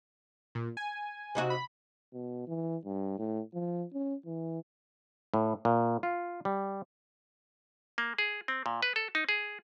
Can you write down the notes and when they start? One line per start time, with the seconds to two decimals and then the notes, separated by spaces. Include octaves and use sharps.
0.55 A#2
0.77 G#5
1.35 C3 D#4 F#4
1.50 B5
2.13 B2
2.47 E3
2.85 G2
3.19 A2
3.54 F3
3.93 C#4
4.25 E3
5.34 A2
5.65 A#2
6.03 F4
6.45 G3
7.98 A#3
8.18 G#4
8.48 C4
8.66 A#2
8.83 B4
8.96 A4
9.15 D#4
9.29 G#4